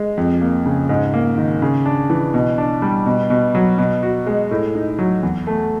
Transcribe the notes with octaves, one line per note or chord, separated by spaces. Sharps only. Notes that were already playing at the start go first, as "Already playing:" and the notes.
Already playing: G#3
F2
A#3
C#3
G#2
A#3
D#3
C#3
D4
E3
B2
D4
G3
B2
B2
F#3
B2
F#4
G#3
A2
D#4
F#3
E2
A3